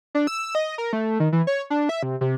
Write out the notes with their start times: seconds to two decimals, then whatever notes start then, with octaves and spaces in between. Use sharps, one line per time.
0.15 D4
0.27 E6
0.55 D#5
0.78 A#4
0.93 A3
1.20 D#3
1.33 E3
1.47 C#5
1.70 D4
1.89 E5
2.03 C3
2.21 C3